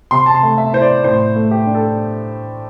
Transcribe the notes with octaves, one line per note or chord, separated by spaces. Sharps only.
C3 C6
A5
C6
A3
E5
E4 C5
D5
A2 C5
A3
G4
D4
A4